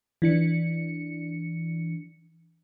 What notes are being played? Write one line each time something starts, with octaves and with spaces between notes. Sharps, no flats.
E3 D4 C#7